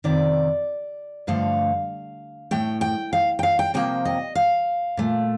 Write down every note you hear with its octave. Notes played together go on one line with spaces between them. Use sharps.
F2 C3 D#3 D5
G2 D3 F3 A3 F5
A2 A3 G5
G5
F5
G5
F5
G5
C3 F3 A#3 G5
D#5
F5
A#2 A3